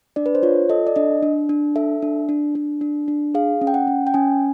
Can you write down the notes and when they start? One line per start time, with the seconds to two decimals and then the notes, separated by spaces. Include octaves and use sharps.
0.16 D4 D5
0.26 B4
0.35 C5
0.43 F4 C#5
0.70 A4 D#5
0.87 D5
0.96 D4 D#5
1.23 D4
1.49 D4
1.76 A4 E5
2.02 D4
2.29 D4
2.55 D4
2.81 D4
3.08 D4
3.35 G#4 F5
3.61 C#4
3.67 G5
3.74 F#5
3.87 C#4
4.07 G5
4.14 C#4 G#5